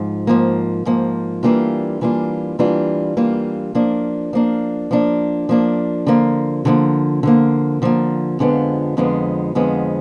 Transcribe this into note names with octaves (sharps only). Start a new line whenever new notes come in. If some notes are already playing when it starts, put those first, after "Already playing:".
Already playing: G#2 F3
G#2 F3 A#3
G#2 F3 A#3
E3 G3 A#3 D4 F4
E3 G3 A#3 D4 F4
E3 G3 A#3 D4 F4
E3 G3 A#3 D4 F4
F3 A#3 D4
F3 A#3 D4
F3 A#3 D4
F3 A#3 D4
D3 F3 A#3
D3 F3 A#3
D3 F3 A#3
D3 F3 A#3
F2 D3 F3 G#3 B3
F2 D3 F3 G#3 B3
F2 D3 F3 G#3 B3